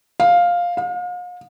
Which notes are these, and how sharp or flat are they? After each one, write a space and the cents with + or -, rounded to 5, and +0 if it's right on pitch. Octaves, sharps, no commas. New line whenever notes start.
F5 +5
F5 +40